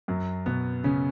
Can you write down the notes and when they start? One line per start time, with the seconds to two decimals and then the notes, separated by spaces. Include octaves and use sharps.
0.08 F#2 F#3
0.46 B2 B3
0.84 C#3 C#4